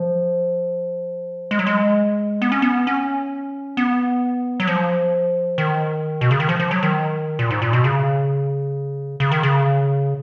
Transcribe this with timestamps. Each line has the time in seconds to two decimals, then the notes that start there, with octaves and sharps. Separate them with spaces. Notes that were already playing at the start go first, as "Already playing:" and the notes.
Already playing: F3
1.51 G#3
1.59 F#3
1.67 G#3
2.42 B3
2.52 C#4
2.62 B3
2.87 C#4
3.77 B3
4.60 F#3
4.67 F3
5.58 D#3
6.21 B2
6.31 C#3
6.40 D#3
6.49 F3
6.60 F3
6.71 F#3
6.83 D#3
7.39 A#2
7.51 G#2
7.62 A#2
7.73 B2
7.84 C#3
9.20 C#3
9.32 D#3
9.43 C#3